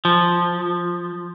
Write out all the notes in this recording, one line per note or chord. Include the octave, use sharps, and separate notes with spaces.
F3